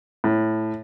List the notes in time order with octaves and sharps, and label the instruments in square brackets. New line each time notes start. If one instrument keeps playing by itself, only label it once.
[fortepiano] A2